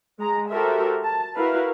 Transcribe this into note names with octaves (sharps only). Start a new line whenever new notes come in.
G#3 G#4 A#5
F#4 G4 A4 A#4 C5 E5
A5
E4 F#4 A#4 B4 E5 F5